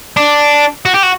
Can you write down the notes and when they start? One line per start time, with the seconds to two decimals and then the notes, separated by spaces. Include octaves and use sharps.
0.17 D4
0.85 F#4
0.94 G4
1.03 F#4